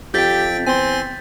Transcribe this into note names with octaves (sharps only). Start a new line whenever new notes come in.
F2 C4 G4 G5 G6 A6 B6
E2 C4 G#5 C6